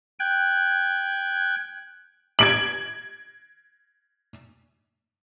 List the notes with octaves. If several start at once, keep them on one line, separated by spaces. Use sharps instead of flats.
G5 F#6 G#6
G#6 D7 F#7